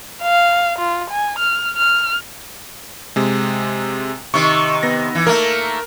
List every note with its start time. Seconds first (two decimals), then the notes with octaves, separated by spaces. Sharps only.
0.22 F5
0.79 F4
1.11 G#5
1.39 F6
1.77 F6
3.16 C3 G#3
4.34 C3 D#3 C#6
4.83 B3 A#6
5.15 E3
5.27 A3 A#3 A#4